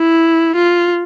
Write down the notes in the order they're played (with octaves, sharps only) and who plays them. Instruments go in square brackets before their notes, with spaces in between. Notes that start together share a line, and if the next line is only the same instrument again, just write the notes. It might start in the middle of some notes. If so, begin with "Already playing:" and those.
Already playing: [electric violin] E4
F4